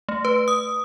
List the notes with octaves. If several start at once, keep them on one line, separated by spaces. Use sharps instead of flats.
A3
B4
D#6